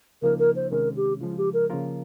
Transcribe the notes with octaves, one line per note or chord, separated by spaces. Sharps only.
C#2 C#3 F3 A#3 D#4 A#4
A#4
C5
C2 C3 D#3 G#3 C#4 A#4
G4
C#3 F3 G#3 F4
G4
A#4
C#3 F3 A#3 F4 A#4